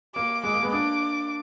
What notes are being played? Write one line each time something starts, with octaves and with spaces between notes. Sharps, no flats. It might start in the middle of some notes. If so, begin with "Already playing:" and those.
A#3 D6
G#3 D6
A#3
G#3 B3
A#3 D4 D6